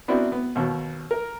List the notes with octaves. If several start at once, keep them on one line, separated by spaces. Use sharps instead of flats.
B3 C4 D4 E4 F#4 A#4
B3
D#2 B2
A#4